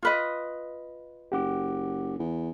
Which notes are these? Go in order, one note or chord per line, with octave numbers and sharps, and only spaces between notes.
F4 B4 D#5
F#1 G4 F#5 D6
E2